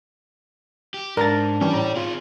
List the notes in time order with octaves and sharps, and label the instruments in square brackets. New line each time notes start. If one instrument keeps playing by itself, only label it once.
[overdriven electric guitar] G4
[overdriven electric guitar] G#2 [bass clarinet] D4 [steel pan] A#4 [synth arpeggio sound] D5 A#5 A6
[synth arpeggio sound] E3 G3 C#4 [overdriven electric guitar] G4 D5
[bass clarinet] A2 [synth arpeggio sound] A#5
[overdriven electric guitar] C4 G#4 [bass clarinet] F4